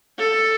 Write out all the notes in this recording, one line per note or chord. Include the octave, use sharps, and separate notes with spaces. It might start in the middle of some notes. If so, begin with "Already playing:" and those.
A4